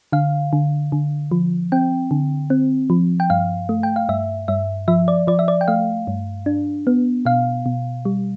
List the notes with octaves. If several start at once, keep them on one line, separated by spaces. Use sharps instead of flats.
D3 F5
D3
D3
F3
C4 G5
D3
C4
F3
G5
G2 F5
A3
G5
F5
G2 E5
G2 E5
F3 E5
D5
F3 D5
E5
D5
G5
A3 F5
G2
D4
B3
B2 F5
B2
G3